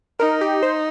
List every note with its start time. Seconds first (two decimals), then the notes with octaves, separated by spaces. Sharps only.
0.20 D#4 A#4
0.41 G4
0.63 C5